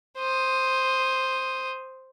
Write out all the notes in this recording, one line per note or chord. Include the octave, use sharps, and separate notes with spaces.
C5 D#6